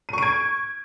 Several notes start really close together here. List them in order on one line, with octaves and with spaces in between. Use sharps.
D#7 C#6 D7 G#6